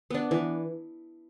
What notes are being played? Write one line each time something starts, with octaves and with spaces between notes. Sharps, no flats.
B3 D4
E3